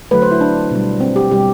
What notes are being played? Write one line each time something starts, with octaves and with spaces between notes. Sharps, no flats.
D3 F#3 A3 B4
C5
E4
D4
B2 G3
C4
G4
B2 G3 G4